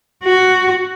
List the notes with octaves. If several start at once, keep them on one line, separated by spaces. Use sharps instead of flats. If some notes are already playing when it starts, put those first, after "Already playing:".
F#4